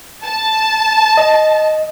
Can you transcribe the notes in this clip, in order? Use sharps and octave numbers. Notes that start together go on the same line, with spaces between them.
A5
D#5